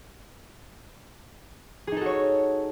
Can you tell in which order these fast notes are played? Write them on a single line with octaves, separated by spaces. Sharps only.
G#4 D#4 A4 F#4 C#5